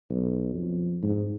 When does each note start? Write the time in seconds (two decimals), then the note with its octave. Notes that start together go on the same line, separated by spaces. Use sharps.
0.10 B1
0.54 F2
1.03 G#2